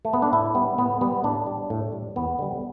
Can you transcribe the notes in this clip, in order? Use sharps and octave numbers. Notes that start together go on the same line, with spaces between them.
A3
B3
D4
A2 E4
G3 B3
A2 B3
G3 B3
A2 D4
G3
A2
G3
E2 B3
D3 G3